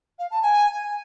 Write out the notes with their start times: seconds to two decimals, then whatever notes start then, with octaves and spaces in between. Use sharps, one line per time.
0.19 F5
0.31 A5
0.42 G#5